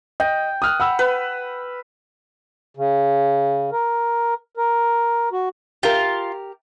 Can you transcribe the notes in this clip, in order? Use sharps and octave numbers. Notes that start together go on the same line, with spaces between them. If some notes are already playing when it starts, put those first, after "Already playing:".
D#5 G5
D#6 F6 F#6
F#5 B5 E6
B4
C#3
A#4
A#4
F#4
F4 G4 A#4